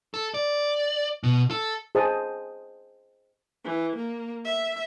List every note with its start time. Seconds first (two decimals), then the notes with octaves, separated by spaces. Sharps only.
0.14 A4
0.34 D5
1.23 B2
1.51 A4
1.95 G#4 C5 D#5 A5 D#6
3.65 E3
3.96 A#3
4.45 E5